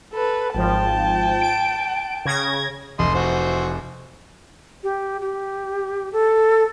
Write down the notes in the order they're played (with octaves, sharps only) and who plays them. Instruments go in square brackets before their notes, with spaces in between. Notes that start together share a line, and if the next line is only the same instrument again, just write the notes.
[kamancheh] A4 B4
[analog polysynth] G#1 F3 [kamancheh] G5 A5
[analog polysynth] D7
C#3 G#6 A#6
[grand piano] F1 [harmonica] D#5 C6
[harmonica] E3 F#4 C5
[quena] G4
G4
A4